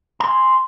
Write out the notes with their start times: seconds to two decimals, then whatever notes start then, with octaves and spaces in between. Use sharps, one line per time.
0.20 A#5
0.24 C6
0.28 G#5